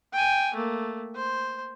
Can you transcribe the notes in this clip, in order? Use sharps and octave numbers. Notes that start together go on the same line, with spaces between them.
G5 G#5
A3 A#3
C5